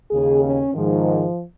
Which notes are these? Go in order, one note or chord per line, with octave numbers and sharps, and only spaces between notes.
D#2 C#3 G#4
C#4
G#2 D#3 F3